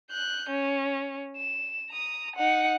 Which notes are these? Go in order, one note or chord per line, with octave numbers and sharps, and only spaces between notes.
F#6 G6
C#4
E7
A#5 D#6
D#4 F#5